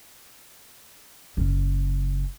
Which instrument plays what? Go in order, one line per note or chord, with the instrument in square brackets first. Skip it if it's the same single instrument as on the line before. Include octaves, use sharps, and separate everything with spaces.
[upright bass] F#1 C#3